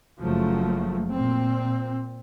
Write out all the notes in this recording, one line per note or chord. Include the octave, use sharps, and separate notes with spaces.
F#1 F3 F#3 A3
A#2 C4